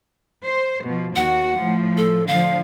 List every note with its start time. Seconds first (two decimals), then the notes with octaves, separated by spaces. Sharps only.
0.45 C5
0.85 B2 F3
1.16 D#2 F#4 F#5
1.58 A2 F3
1.97 A4
2.27 D3 F3 F5